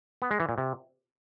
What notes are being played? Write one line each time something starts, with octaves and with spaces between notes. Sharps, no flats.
B3
G#3
E3
A#2
C3